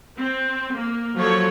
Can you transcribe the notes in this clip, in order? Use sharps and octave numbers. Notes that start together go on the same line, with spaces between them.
C4
A#3
F3 F#3 A4 C#5